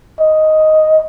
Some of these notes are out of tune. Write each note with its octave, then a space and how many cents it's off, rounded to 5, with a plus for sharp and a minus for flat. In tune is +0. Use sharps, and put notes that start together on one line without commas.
D#5 +5